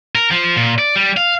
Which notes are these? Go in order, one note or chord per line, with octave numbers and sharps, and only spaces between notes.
A#4
F3
A#2
D5
G3
F5